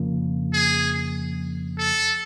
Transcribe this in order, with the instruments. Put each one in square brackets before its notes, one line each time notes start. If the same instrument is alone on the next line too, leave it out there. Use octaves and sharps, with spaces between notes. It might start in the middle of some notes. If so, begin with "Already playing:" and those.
Already playing: [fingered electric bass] F2 C#3 F3 A#3
[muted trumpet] G#4
A4